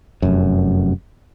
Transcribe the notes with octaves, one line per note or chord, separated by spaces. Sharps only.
F1 F#2